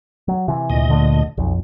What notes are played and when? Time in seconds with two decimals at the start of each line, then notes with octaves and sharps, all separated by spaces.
0.28 F#3
0.48 C3 E3
0.70 D2 A#2 D#5
0.90 D3 A3
1.38 B1 F2